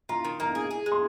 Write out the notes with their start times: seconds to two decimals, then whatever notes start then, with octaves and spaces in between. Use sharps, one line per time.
0.09 F4 A#5
0.25 D#3
0.40 A#3 A#5
0.55 G#4
0.71 G#4
0.86 G#3
0.92 C6